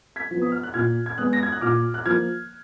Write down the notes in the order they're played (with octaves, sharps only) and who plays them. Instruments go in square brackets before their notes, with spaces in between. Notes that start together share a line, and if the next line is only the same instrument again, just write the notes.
[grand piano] G#6 B6
F3 B3
D#6
F6
F#6
A#2 F6 G#6
G#6
G#3 B3 D#6 F#6
A#6
G#6
F#6
A#2 D6 F6
F#6
F3 A#3 F6 G#6